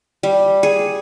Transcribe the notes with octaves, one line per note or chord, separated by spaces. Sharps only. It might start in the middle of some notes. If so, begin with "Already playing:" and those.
G3
G#4